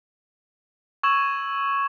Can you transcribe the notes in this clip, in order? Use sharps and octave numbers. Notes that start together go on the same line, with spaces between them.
C#6 E6 G#6 E7 F#7